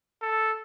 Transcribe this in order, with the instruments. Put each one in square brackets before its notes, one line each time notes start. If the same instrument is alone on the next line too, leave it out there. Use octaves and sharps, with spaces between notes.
[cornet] A4